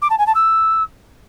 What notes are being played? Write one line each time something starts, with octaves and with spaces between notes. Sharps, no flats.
D6
A5
G#5
A5
E6